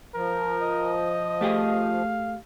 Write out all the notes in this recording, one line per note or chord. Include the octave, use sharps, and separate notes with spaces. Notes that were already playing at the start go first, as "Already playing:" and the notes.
F3 A#4
D#5
A3 G4 G#4 F5